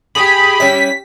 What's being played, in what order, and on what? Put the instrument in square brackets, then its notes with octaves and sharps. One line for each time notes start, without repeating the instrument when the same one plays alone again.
[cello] G4 [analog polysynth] G#4 B5
[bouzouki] G3 C#4 E4 [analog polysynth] B6